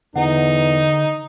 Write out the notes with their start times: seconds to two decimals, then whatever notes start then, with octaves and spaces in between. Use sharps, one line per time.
0.16 E2 D3 D#4 F#5